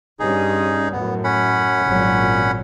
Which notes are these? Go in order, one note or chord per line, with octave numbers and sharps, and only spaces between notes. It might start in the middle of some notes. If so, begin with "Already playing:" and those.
G2 C#4 D#4 G#4
F#2 A2 B3
C#4 F#5 B5
G#1 A#2 F#3